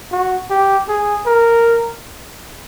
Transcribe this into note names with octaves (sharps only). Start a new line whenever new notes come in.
F#4
G4
G#4
A#4